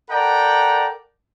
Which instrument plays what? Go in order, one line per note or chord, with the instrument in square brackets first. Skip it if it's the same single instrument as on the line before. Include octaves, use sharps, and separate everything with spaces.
[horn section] A4 A#4 D5 F#5 G5 A#5